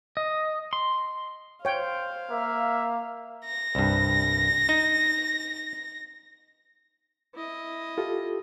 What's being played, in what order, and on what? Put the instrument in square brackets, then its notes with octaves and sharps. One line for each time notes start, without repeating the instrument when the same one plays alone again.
[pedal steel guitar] D#5
C6
[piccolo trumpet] C5 [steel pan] C#5 G5 [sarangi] F5
[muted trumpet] A#3 [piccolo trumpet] E5
[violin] A#6
[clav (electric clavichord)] C2 G2
D#4
[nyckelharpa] E4 D#5
[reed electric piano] F4 G4 A4